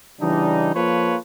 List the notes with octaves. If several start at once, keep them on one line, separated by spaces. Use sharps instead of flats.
C#3 E3 G3 D4 D#4
F3 A#3 F4 A4 B4 C#5